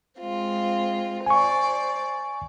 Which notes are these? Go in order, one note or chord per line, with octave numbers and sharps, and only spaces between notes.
G#3 C4 F4
C5 D5 G#5 C#6